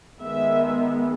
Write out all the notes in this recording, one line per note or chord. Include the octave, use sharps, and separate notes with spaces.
D#3 G#3 B3 E5